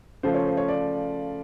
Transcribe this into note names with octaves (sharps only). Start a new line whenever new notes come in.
C#3 F3 A3 C5
C#5
C5
C#5
D5